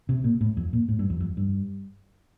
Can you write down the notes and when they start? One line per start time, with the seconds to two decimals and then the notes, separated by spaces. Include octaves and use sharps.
0.09 C3
0.24 A#2
0.41 A2
0.57 F2
0.73 A#2
0.89 A2
0.99 G2
1.10 F2
1.20 F2
1.37 G2